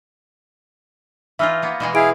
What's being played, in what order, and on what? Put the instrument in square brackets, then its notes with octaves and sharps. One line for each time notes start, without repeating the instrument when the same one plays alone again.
[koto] E3 D#4 F4 [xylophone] E5 E6 F6
[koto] A#3 B3
B2 E3 G#3
[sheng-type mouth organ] E4 G#4 F5 [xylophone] D7